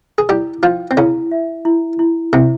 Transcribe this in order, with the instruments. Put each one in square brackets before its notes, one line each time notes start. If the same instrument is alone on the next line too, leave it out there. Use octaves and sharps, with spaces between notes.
[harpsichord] G#4
[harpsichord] G3 G4 [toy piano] E4
[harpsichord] F3 F4 [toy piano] G5
[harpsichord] C4
[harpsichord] C#3 C#4 [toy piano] E4
[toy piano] E5
E4
E4
[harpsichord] C3 C4 [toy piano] E4